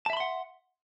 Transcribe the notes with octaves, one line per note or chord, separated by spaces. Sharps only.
E5 F#5 A5 B5 C6